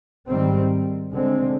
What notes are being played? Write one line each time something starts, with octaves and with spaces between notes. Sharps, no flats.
G#2 D#3 G3 C4
D3 G#3 C4